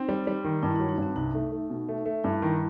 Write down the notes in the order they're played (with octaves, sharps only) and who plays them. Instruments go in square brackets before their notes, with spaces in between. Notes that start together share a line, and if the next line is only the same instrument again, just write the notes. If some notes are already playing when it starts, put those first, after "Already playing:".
Already playing: [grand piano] C4 [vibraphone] D#4
[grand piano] G3
G3
D#3
[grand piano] G2 [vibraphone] E4
[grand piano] F#3 [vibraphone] D#4
[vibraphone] D#4
[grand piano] G2 [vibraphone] C4
[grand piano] C2 [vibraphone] D#4
[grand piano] A3
A3
B2
A3
A3
[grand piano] G2 [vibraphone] E4
[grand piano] D#3